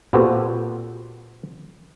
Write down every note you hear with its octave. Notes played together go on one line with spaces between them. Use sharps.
A#2 B3 C4 F#4 G4 A4